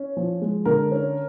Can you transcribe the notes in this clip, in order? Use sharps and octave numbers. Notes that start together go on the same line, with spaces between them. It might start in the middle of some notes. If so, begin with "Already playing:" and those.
Already playing: C#4
F3
G#3
D3 A#4
C#4